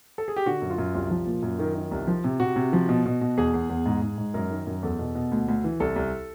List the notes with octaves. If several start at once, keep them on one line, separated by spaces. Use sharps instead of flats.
A4
G#4
G4
D3 F#4
F#2
F4
F#2
C2 F4
F3
A#2
F#2
D#3
D#3
C2
F3
C3
C3 F#4
C3
F3
B2
B2
B2
E2 G#4
E2
E2
G#2
G#2
G#2
F#2 A#4
D#3
F#2
E2 A4
B2
B2
D2
D2
E3
C2 A4
C2